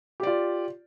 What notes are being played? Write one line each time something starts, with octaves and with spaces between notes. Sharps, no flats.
F4 G4 D5